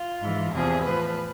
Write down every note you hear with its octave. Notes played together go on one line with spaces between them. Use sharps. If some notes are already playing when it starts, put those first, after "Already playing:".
Already playing: F4
G#2 E3
E2 C3 F3 G#4
A2 F3 B4